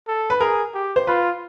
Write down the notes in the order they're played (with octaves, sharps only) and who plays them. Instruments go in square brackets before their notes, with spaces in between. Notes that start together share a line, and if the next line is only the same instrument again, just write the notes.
[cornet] A4
[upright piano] B4
[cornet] G#4 [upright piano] A#4
[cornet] G4
[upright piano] C5
[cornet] F4 [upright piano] B4